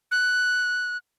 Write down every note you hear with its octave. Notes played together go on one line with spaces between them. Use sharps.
F#6